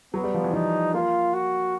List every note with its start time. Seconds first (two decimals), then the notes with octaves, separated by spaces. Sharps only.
0.14 F#3 B3
0.24 G3
0.34 F3
0.44 E3
0.53 F3 D#4
0.94 A#3 F4
1.34 F#4